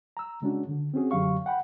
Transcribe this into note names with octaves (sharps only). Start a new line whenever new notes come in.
A#5 E6
C#3 G#3 C#4 D4 F#4
D3
C4 C#4 F#4 G#4
F#2 D3 F#3 G4 F5 C#6
F#5 G5 B5